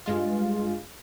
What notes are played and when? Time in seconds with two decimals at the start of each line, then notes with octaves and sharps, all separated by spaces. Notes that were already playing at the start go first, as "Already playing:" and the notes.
0.06 G2 G#3 F4